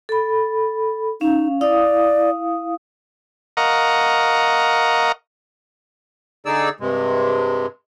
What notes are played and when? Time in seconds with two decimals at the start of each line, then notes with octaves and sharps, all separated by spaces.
0.09 A4 B5
1.21 C#4 D#4 F5
1.61 E4 D5 F5 D#6
3.57 A#4 D#5 F5 F#5 A#5 C#6
6.46 D3 D#4 G#4 D5 E6
6.80 G2 C3 G#3